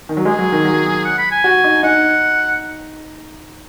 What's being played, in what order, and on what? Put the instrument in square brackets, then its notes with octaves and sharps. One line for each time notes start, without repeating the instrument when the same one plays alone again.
[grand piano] D#3
F#3
[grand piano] G#3 [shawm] G#4
[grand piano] F#3
D#3
F#3
[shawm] F#5
B5
G#5
[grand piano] F#4
D#4
[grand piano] D#4 [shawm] F#5